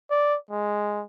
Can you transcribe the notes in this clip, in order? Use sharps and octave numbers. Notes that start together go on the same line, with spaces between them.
D5
G#3